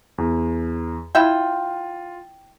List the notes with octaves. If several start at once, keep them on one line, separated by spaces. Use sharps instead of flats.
E2
E4 F4 E5 G5